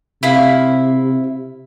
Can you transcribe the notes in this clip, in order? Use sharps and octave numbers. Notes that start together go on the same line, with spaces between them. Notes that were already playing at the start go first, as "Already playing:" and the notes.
C3 E4 E5 F5